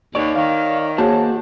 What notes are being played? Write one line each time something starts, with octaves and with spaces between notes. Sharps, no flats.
D#2 C#5 D5 C#6
D#3 F5
A#3 F#4 G#4 C5 C#5 A5